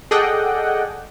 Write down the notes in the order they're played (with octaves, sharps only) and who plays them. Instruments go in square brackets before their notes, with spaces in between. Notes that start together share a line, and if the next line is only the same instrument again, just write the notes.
[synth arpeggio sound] G#4 A4 D5 D#5 F#5 G5